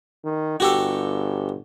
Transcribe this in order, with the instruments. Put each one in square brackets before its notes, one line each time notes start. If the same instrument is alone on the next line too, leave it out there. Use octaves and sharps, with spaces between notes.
[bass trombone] D#3
[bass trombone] G1 [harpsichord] F#4 G4 A4